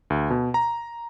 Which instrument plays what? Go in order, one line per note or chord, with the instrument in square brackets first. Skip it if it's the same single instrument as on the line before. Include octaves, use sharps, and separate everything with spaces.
[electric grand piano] D2
B2
A#5